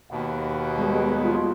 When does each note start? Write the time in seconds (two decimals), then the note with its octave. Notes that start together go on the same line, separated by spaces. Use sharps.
0.11 D#2 B2
0.78 G3 G#3 B3
1.23 F4